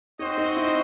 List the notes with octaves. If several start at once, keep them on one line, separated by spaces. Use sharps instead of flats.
C4 D#4 F#4 C5 D#5
D#4
E4